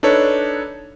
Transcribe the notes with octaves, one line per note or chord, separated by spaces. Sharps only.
D4 D#4 A4 B4 C#5